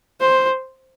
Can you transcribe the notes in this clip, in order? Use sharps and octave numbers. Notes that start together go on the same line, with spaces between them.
C5